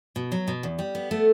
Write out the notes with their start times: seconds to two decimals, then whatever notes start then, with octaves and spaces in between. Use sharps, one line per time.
0.16 B2
0.32 F#3
0.48 B2
0.63 E2
0.79 G3
0.95 B3
1.11 A3